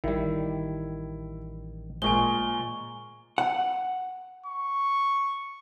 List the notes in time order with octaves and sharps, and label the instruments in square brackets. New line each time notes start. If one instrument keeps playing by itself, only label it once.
[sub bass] A1 [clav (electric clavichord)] D#3 G3 [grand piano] E4
[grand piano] A#2 G#3 [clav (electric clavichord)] C5 [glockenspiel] G#5 C#6 G7
[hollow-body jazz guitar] F#5
[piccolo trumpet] C#6